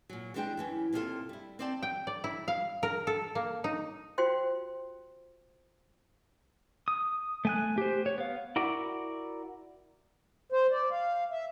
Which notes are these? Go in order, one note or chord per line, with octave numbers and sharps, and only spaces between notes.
A#2 F#3
E3 G3 G#3 D4 G#4 G5
F#2 E3 C#4
D#2 C3 A#3 C#4 F4 A4
G3 E4
C4 C5 D5 G5 A5
G5
D5
E4
F5
A#4
A4
A#3
D#4
F4 F#4 C5 G5 C6
D#6
A3 G#5 F#6
G4 C5
C#5
B3 F5
E4 F#4 A#4 D5
C5
D5
F5
E5